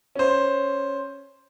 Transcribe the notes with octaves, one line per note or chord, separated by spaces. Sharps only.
C#4 C5